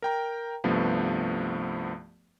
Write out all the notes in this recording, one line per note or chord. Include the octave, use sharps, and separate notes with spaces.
A#4 G5 A#5
C2 G2 F3 A3 B3